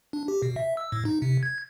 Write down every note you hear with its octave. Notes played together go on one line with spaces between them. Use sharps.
D4
G4
B2
E5
E6
A2
D#4
C3
G#6